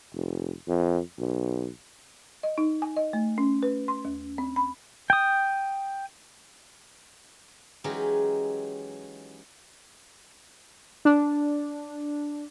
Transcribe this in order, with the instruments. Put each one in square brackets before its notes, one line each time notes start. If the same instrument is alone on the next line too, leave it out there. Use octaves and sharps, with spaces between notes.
[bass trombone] F1
F2
B1
[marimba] D#5
D#4
G#5
D#5
A3
C#4
B4
C6
D#2
C4
B5
[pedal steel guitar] G5 D#6
[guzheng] E3 F#3 G#3 C#4 D#4 G4
[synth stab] D4